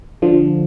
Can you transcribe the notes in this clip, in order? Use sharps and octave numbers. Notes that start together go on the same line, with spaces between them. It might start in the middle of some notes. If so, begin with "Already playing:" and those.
D3 F3